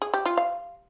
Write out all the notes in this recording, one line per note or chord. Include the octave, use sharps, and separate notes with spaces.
G#4
G4
F4
F5